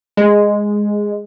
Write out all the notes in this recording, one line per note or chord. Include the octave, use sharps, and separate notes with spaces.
G#3